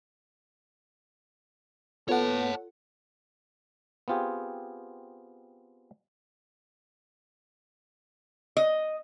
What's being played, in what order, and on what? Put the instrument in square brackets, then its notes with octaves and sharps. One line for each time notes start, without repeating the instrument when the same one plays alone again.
[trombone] B3 [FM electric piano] F4 A4 F#5 [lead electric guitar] C#5 A5
[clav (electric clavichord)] B3 C4 F4 G4 G#4
[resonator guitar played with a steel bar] D#5